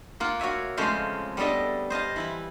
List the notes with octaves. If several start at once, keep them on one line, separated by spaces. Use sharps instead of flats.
A#3 F4 F#5
F#4 C#5 E5 G#5
F2 C#3 G#3 A3 C5 F5
G3 B3 D4 A4 D#5 E5
C5 D#5 F5 A5
E3 E4 B4